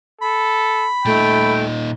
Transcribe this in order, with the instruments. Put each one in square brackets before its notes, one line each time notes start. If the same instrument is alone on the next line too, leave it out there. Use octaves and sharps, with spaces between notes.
[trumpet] A4 [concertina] B5
[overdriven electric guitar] A#2 D#4 [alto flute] A3 [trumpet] G5